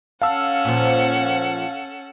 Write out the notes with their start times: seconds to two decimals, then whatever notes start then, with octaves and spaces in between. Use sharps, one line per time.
0.22 C#4 A4 F5 F#5 A5 E6
0.65 A#2 F3